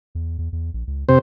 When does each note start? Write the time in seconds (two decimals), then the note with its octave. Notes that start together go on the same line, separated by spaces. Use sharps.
0.15 E2
0.38 E2
0.52 E2
0.74 A#1
0.87 C#2
1.09 F2 C3 C5